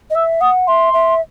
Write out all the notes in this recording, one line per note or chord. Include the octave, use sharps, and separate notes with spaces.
D#5
E5 E6
F#5 D#6
E5 C6
E5